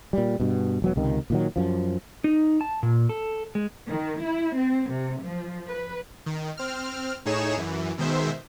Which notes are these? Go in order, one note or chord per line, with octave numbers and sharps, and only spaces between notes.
A#2 G3
G2 B2
E1 F#3 B3
C#2 C3 D#3
A#2 D#3 F#3
F#2 F3
D#4
A5
A#2
A4
G#3
D#3
E4
C4
C3
F3
B4
D#3
C4 F6
A2 D#4 G#4 C#5 E7
F#2 E3
B2 D#3 G#3 C5 E5